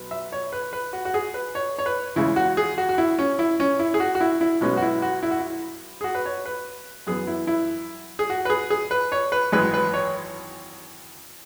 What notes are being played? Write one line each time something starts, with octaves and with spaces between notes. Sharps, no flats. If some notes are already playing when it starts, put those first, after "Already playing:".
Already playing: B1 B2 B3
E5
C#5
B4
B4
F#4
F#4
G#4
B4
C#5
C#5
B4
E2 C#3 G#3 E4
F#4
G#4
F#4
F#4
E4
C#4
E4
C#4
E4
G#4
F#4
F#4
E4
E4
B1 B2 G#3 B3 C#4
F#4
E4
F#4
E4
F#4
E4
G#4
F#4
B4
C#5
B4
F#2 E3 B3 G#4
E4
E4
G#4
F#4
B4
G#4
G#4
B4
C#5
B4
G#1 F#2 E3 G#3 B4
B4
C#5